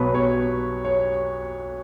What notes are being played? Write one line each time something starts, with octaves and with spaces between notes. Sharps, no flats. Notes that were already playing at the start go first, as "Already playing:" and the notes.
Already playing: B1 B2 F#3 B3 B4
C#5
C#5